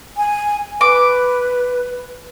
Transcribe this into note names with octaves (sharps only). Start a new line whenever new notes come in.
G#5
B4 D6